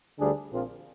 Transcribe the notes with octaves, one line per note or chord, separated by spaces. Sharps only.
D2 D3 G3 D4 G#4
A#1 A#2 F3 C4 F4